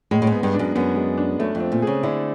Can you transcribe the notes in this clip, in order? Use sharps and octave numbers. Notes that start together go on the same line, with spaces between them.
A2 G#3
A2
G#2
B3
G2
D4
F#2
F#2 B3
G#3
D4
F#2 A3
F2
C4
A#2
C#3 G#4
D3 E4